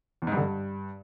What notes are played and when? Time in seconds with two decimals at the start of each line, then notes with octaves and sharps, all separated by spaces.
0.22 E2
0.27 G#2
0.32 G2
0.37 D3
0.42 G2